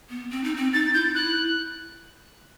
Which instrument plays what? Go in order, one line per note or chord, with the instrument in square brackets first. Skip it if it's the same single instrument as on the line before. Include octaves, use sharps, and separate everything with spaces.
[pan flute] B3
C4
D#4
C4
[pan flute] D#4 [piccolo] A6
[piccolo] A6
[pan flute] E4 [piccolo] G6
[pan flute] E4 [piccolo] F#6